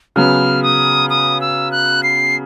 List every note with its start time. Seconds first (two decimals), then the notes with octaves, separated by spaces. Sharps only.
0.16 C#3 F#3 B3 F6
0.63 D#6
1.10 D#6
1.41 E6
1.72 F#6
2.03 C7